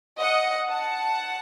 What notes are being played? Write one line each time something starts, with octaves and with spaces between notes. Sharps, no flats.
D#5 F#5
F#5 A5